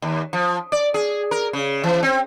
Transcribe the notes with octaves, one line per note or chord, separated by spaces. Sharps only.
D#2
F3
D5
G#4
A#4
C#3
E3
C4